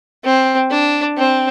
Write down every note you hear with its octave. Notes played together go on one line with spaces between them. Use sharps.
C4
D4
C4